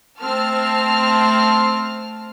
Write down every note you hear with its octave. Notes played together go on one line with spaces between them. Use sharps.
A3 C4 A5 F6